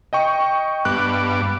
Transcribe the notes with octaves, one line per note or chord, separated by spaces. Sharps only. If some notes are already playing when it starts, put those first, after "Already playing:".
D#5 G5 C#6
G2 B3 D6 F#6